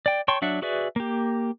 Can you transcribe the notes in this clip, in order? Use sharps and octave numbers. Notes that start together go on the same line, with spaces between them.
D5 G5
C#5 G5 A5 C6 C#6
F#3 D4 E5 F#5
F#4 G#4 B4 D5 E5
A#3 G4